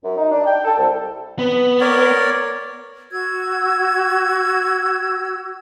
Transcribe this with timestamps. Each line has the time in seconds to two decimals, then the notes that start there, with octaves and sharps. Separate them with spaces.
0.04 F#2
0.17 D#4
0.32 D4
0.45 G5
0.64 A4
0.78 C2
1.39 B3
1.81 A#4 C#5 D5
3.12 F#4 E6 G#6